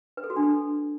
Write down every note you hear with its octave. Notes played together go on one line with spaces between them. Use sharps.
B4
A4
F#4
D4
A4